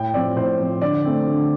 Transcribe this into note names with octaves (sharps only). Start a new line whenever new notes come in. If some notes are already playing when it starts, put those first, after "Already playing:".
Already playing: A2 G5
F3 C4 D5
A2 C5
F3 C4
D3 D5
A3 C4
D3